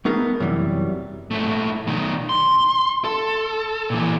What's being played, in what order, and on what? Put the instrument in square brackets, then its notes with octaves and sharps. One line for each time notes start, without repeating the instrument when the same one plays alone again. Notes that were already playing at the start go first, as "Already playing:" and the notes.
[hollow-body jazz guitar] A3 B3 D#4 G#4 A#4
F#2 C3 E3 F#3 G3
[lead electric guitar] G#2 A3
B2 D#3
C6
A4
A#2 E3